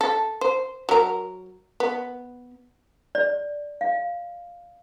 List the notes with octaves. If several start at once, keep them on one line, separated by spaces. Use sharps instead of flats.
A4
C5
F#3 A#4
B3
D5
F5